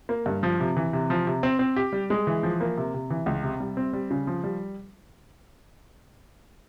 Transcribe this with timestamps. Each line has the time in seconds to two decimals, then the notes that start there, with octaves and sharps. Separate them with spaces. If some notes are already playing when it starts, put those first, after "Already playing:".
0.09 A#3
0.26 G2
0.43 F3
0.60 C3
0.77 E3
0.93 C3
1.10 F3
1.27 C3
1.43 C4
1.59 C4
1.76 G4
1.93 G3
2.10 G#3
2.27 E3
2.43 F3
2.61 A#3
2.77 C3
2.94 C3
3.10 E3
3.26 C#2
3.43 C3
3.60 G3
3.77 C4
3.93 G3
4.11 C#3
4.27 F3
4.44 G3